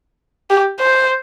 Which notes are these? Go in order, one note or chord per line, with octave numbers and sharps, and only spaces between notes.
G4
C5